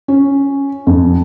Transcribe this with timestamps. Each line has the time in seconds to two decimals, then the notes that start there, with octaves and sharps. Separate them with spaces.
0.08 C#4
0.87 F2